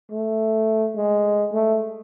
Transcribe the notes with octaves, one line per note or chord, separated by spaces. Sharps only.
A3
G#3
A3